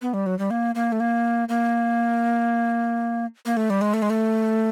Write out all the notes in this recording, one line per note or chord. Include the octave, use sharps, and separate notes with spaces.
B3
G3
F#3
G3
A#3
A#3
A3
A#3
A#3
A#3
A3
G3
G#3
A3
G#3
A3